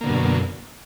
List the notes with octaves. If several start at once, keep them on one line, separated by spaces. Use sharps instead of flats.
F#2 B2 D3 A#3